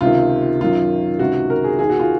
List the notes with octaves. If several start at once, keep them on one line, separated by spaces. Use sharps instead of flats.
C#2 C3 D#3 F4
F#2 D#3 F4
C#2 C3 D#3 F#4
A#4
G#4
D#2 D#3 G#4
F#4
F4